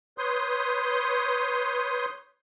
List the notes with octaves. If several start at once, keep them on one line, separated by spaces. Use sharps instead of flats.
B4 C#5 C6 D#6 G6